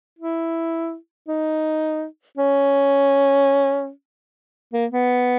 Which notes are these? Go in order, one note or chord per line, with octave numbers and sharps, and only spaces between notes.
E4
D#4
C#4
A#3
B3